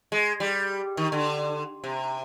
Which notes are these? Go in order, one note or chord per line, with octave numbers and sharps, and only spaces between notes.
G#3
G3
D#3
D3
C3